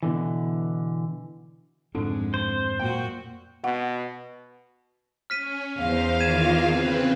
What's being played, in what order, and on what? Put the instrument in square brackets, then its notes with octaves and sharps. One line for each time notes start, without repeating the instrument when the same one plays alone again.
[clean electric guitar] B2 D3 E3
[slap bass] F2 G#2 C4 [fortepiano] D3 [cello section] G#3
[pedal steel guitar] C5
[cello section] F#2 A#2 F#4 [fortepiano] G5
[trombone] B2 [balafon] F#5
[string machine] C#4 [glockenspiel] F6 B6 D#7
[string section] E2 F5 [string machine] C5
[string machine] D#3 F4 [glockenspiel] G#6 D#7 E7
[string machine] C#3 C4 B4